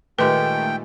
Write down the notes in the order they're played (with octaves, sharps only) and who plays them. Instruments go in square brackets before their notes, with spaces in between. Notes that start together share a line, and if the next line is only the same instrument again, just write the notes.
[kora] A#2 G#3 G4 [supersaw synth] D#3 A3 [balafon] B4 [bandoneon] G5